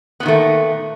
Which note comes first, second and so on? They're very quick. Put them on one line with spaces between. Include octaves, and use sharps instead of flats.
B3 A#2 D#3 A3